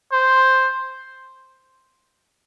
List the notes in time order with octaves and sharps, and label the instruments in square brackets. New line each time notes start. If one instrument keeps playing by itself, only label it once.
[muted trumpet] C5